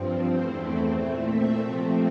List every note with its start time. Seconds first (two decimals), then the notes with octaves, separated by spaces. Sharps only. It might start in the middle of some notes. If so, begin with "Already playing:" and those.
Already playing: G2 F3 C4
0.31 E2 E3 A3 C4 C5
0.65 D5
0.96 A#2 A3 C4 E5
1.28 E5
1.60 C3 F3 A3 C4